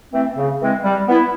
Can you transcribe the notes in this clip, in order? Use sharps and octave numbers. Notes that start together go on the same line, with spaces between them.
E3 A3 C4
C#3
E3 G#3 C4
G3
B3 E4